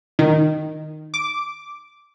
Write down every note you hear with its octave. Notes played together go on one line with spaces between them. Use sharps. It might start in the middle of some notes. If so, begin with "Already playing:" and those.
D#3
D6